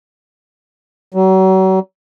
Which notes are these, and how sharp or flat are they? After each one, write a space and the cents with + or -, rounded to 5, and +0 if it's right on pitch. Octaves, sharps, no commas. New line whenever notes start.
F#3 +35